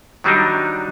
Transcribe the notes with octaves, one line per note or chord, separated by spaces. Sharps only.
D#3 F#3 G3 D4 D#4